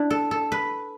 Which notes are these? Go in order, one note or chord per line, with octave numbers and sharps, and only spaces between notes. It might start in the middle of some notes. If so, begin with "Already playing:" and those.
Already playing: D4 E4
A4
A4
B4